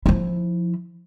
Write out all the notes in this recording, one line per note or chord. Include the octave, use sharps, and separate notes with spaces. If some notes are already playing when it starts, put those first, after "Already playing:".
F3 E4